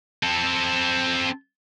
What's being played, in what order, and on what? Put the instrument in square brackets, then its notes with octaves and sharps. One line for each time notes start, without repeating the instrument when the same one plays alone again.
[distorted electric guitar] C4 A4